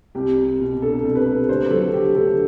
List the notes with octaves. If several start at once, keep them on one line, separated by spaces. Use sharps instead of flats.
C2 G4
G3
B2
D4 A4
C2
B4
G3
D2 C5
F#3 A4
D3 G4
D2 A4